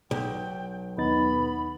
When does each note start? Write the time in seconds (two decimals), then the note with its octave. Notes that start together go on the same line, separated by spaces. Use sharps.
0.11 B1 G5
0.98 D#2 B3 D#4 B5 A6